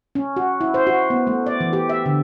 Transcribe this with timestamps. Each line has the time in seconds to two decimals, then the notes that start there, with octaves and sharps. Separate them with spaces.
0.15 C#4
0.36 F#4
0.61 E4
0.74 C5
0.87 F#4
1.10 B3
1.27 A3
1.46 D5
1.60 E3
1.73 G4
1.89 E5
2.06 D3